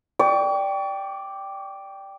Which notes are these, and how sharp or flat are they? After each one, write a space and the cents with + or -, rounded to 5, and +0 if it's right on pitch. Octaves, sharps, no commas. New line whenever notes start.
D5 +0 G5 +0 C#6 +40